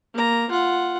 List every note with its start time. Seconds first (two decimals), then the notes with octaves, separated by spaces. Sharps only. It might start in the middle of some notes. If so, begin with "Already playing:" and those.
0.14 A#3 A#5
0.50 F4 F#5